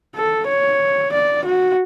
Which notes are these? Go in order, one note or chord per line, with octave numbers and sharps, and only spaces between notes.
A4
C#5
D5
F#4